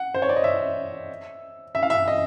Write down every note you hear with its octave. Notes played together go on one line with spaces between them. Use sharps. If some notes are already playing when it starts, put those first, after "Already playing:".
Already playing: F#5
C5
C#5
D5
D#5
E5
E5
F5
E5
D#5